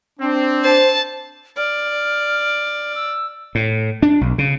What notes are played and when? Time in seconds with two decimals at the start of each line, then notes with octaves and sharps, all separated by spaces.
0.19 C4 D4
0.64 C5 A5
1.57 D5 F6
2.95 E6
3.55 A2
4.02 D4
4.21 B1
4.38 C#3